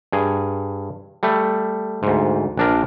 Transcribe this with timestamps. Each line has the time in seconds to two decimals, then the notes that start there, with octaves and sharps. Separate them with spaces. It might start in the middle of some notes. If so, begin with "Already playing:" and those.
0.13 G2 G#4
1.23 G3 A3
2.03 D2 G#2
2.57 A#1 D4 A#4